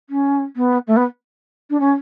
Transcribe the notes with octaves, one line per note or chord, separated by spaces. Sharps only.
C#4
B3
A3
B3
D4
C#4